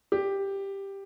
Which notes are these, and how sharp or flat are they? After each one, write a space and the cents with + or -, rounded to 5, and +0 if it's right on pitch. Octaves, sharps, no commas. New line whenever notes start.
G4 +5